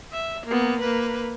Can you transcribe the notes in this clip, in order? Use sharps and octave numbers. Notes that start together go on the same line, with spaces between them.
E5
A#3 B3
A#3 B4